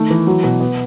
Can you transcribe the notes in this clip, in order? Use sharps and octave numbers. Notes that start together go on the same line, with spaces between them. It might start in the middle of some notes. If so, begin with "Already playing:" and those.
Already playing: D#3 A3
E3
F#3
B2
B3